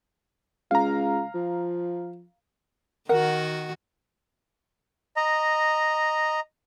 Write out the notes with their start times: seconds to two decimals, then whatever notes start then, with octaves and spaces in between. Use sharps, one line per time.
0.71 C#2 F5 A#5
1.34 F3
3.09 D#3 F#4 A#4 F#5
5.16 D#5 A#5